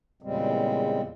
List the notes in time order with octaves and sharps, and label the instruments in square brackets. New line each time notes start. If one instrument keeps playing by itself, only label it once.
[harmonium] E2 A#2 C#3 G3 G#3 C4